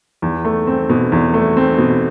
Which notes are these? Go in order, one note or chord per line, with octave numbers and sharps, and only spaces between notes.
E2
A3
C4
B2
E2
A3
C4
B2